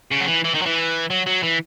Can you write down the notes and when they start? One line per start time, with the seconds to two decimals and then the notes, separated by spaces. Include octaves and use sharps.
0.11 C#3
0.21 F#3
0.27 E3
0.44 E3
0.54 D#3
0.62 F#3
0.66 E3
1.10 F#3
1.26 F#3
1.43 E3